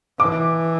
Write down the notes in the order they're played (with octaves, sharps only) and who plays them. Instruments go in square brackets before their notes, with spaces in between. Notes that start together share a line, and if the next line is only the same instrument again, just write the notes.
[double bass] E3 [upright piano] D6